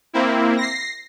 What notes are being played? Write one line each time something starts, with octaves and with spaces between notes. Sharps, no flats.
A#3 C4 E4
A#6 C7